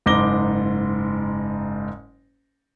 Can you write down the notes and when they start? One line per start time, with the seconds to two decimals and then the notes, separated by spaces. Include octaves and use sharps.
0.06 F#1 G#2 D6 A#6 G7